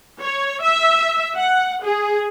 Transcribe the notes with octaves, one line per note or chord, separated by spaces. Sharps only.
C#5
E5
F#5
G#4